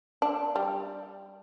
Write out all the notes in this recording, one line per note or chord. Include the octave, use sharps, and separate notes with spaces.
D4
G3